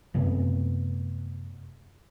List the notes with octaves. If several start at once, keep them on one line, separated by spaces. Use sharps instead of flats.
F#2 C3 A3 B3